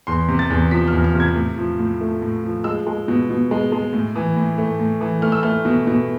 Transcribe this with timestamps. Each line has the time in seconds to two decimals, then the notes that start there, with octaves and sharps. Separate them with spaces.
0.07 E2 C6
0.28 C3
0.39 A6
0.50 E2
0.71 F3 B6
0.88 F6
0.93 E2
1.04 F6
1.14 C3
1.20 G#6
1.35 A2
1.58 F3
1.79 A2
2.01 A3
2.22 A2
2.44 F3
2.64 G#3 E6
2.87 G#3
3.08 B2
3.30 B2
3.51 G#3
3.72 G#3
3.93 A2
4.15 E3
4.36 A2
4.58 A3
4.80 A2
5.01 E3
5.22 A3 F6
5.32 E6
5.43 A3 F6
5.65 B2
5.87 B2